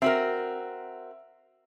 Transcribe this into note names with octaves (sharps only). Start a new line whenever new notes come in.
C4 F#4 A#4 E5